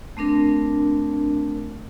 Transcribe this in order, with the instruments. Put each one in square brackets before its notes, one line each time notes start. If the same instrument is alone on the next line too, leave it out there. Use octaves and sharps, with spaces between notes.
[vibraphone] A3 C4 D4 A#4